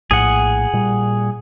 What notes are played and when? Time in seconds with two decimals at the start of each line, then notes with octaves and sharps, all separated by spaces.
0.11 A#1 A2 G#4 F#5
0.73 A#2 G3